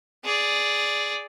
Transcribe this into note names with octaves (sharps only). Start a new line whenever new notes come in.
G#4 D5